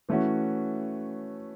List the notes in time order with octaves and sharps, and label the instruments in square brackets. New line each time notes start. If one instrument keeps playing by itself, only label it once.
[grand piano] E3 A3 C#4 F#4